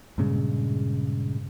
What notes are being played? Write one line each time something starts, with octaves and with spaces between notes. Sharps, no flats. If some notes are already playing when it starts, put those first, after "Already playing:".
G2 A#2 C#3 G#3